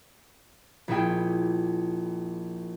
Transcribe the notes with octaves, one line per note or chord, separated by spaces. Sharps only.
A#1 A#2 E4 G#4 G5